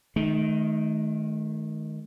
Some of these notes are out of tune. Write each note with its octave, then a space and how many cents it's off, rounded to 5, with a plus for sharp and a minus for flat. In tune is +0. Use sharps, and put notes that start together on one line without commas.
D#3 +0 A3 -40